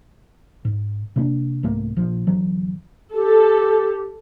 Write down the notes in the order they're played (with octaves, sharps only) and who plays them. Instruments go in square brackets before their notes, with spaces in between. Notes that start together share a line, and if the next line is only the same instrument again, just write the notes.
[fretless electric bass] G#2
C3 A#3 C#4 D4
C2 G#2 A3 A#3
A#1 F3
G1 G2 E3 F#3
[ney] G4 [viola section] A4